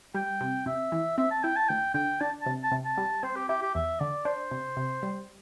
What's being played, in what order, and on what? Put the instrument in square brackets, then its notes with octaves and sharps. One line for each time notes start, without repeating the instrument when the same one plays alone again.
[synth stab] G3 [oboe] G5
[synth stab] C3
[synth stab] C3 [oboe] E5
[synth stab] E3
[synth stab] C4 [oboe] E5
[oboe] A5
[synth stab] E4 [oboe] G5
[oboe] A5
[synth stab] D2 [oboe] G5
[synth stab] D3 [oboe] G5
[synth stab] D4 [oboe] A5
[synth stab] C3 [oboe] A5
[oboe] A5
[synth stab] C3
[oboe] A5
[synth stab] G3
[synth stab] C4 [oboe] C5
[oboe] G4
[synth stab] E4 [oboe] G4
[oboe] G4
[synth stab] E2 [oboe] E5
[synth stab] D3 [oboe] D5
[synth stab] D4 [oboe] C5
[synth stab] C3
C3
G3